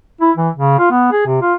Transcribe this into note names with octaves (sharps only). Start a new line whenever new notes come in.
E4
E3
C#3
F4
B3
G#4
C3
F4